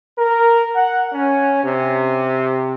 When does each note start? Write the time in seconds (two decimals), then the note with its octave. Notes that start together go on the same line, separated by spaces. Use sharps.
0.17 A#4
0.74 F#5
1.13 C#4
1.64 C3